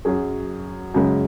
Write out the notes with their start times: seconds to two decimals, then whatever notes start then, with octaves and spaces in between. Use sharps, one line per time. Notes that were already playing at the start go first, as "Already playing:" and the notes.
0.05 F#2 F#3 G#4
0.94 F#2 C#3 G#3